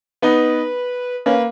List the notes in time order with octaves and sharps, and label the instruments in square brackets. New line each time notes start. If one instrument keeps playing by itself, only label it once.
[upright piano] B3 D#4 [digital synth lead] B4
[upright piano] A#3 C#4 [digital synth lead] B4